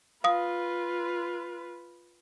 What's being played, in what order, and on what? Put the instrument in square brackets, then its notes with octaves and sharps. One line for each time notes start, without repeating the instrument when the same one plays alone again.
[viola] F4 B4 [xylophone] F5 D#6